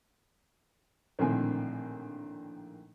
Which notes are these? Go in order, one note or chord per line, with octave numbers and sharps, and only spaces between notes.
A#1 A2 D3 D#3 C4 G#5